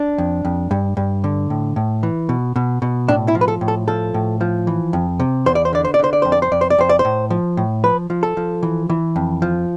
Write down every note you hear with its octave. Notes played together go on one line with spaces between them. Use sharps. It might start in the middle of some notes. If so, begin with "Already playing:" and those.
Already playing: D4
F2
F2
G2
G2
D3
A2
A2
E3
B2
B2
B2
A2 D4
E4
F3
B4
A4
A2
A4
F3 A4
A2
F3
E3
F2
C3
E2 C5
D5
C5
D3 D5
C5
D5
D3 C5
D5
F2 C5
D5
C5
F2 D5
C5
D5
F2 C5
D5
C5
A2
F3
A2
F3 B4
F3
A4
F3
E3
E3
F2
F3